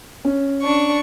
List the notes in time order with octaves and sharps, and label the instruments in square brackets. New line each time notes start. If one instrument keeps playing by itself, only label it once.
[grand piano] C#4
[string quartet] D4 C#6